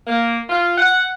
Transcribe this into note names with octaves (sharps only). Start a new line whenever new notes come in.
A#3
F4
F#5